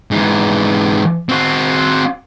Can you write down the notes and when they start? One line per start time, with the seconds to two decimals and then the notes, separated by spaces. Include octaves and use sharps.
0.11 G#2 E3
1.29 C4 F#4